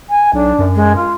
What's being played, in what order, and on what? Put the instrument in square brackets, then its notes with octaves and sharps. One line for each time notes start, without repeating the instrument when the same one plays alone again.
[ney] G#5
[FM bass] B1 [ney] D4
[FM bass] F#2
[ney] G#3
F4